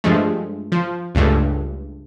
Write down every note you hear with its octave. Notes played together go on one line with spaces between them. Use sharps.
G2 F3 G#3 A3
F3
C#2 G2 A3